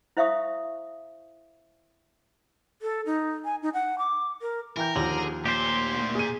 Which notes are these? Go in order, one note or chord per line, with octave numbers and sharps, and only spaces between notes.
E4 C5 E5 F5 C#6 D#6
A4
D#4
G#5
D#4
F#5
D6
A#4
E3 A#4 G5 G6
D#2 D3 F3 G#4
D2 A#2 G4 C5 C6
G#4 D#7